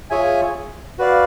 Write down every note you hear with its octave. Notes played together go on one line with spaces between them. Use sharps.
F4 G#4 C#5 E5 G#5
F#4 B4 D5 F5